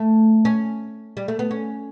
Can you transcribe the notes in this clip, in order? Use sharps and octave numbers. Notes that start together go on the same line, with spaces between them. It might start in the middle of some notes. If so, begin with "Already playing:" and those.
Already playing: A3
C#4
G3
A3
B3
C#4